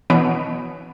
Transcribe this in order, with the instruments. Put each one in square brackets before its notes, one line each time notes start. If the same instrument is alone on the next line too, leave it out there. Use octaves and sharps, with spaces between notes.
[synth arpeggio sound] B2 E3 B3 C#5 D7